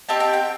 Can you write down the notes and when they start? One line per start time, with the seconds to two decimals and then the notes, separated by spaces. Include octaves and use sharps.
0.09 C4 D#4 G4 A5
0.20 G5
0.33 G5